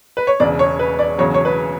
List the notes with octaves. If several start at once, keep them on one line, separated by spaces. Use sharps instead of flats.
B4
C#5
E1 E2 C#3 D5
C#5
B4
D5
E1 E2 C#3 F#3 C#5
C#5
B4